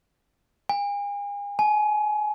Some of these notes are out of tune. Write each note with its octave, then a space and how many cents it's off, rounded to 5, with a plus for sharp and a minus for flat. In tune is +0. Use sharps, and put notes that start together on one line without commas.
G#5 -40
G#5 +30